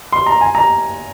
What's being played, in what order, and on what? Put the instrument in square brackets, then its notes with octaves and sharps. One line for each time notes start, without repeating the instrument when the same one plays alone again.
[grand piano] C6
A#5
G#5
A#5